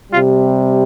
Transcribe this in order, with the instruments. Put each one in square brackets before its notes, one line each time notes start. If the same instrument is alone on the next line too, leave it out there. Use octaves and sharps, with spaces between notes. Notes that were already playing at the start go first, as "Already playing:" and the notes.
[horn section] C3 G3 F4